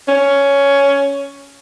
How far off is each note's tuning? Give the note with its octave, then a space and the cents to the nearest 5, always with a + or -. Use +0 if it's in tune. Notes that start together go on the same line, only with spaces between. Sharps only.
C#4 +10